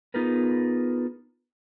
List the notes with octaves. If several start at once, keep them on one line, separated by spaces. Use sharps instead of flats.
B3 D#4 F4 G#4 A#4 B4